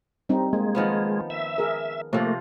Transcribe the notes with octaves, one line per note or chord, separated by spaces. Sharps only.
G3 C4 D#4
G#3 A#3
D#3 F3 B3
E5
G#4 A#4
C3 F3 A3 A#3